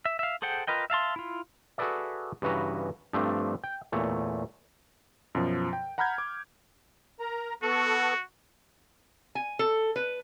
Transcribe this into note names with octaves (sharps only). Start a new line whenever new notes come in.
E5
E5 F5
G#4 A4 C5 F#5 G5
F4 A#4 B4 D#5 G5
E5 F5 A5 C6
E4 F4
F#4 G#4 A4 B4 D5 E5
G2 C#3 E3 F#4 B4 A#5
G2 F3 A3 C4 D4
G5
E2 A#2 A3 C#5
F#2 B2 F3
G5
F#5 A#5 B5 F6 G6 G#6
D6
A#4 A#5
B3 F#4 A4 C#6
G#5
A4
B4